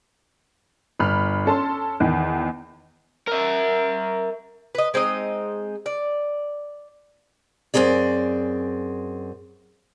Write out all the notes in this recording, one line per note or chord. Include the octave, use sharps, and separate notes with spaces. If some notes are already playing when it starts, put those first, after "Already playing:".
G1 B5 F6
C#4 A4 A5 C6
E2 D#3
A#4 E5
B4 D#5
G#3 C4 D#4 D#5
D5
F#2 B2 C4 G#4 D5